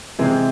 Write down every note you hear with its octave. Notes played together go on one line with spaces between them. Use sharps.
C3 E3 G#3 C4